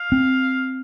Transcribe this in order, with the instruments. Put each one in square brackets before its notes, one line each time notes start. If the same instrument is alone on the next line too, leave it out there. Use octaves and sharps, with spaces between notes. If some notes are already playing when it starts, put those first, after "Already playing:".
Already playing: [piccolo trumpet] F5
[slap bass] C4